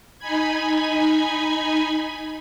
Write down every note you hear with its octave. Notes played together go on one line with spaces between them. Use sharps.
D#4 G#5 B5 G#6